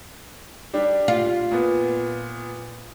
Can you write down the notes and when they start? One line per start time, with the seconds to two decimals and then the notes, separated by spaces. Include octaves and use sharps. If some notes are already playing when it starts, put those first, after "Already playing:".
0.73 G3 D4 G4
1.08 F4
1.51 A#2 B3